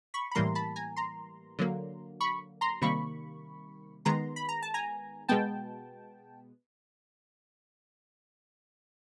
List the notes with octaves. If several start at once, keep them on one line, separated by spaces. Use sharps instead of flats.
B5 C#6
B5
A2 E3 G3 A#3 A#5 C6
A5 B5
G#5 A#5
A#5 C6
D3 F#3 A#3
B5 C#6
A#5 C6
C3 D#3 G3 A#3 B5 C#6
D#3 G#3 B3 A#5 C6
B5
A#5
A5
G#5 A#5
B2 G#3 B3 G5 A5